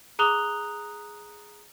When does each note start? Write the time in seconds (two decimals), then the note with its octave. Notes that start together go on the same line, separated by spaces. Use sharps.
0.19 G#4 A#5 D#6 F#6 F7 G7